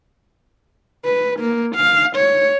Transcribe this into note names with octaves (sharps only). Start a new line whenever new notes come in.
B4
A#3
F5
C#5